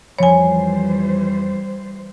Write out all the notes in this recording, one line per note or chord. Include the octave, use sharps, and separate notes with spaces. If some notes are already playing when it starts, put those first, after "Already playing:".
F2 E3 F3 G3 C5 C#5 G#5 B5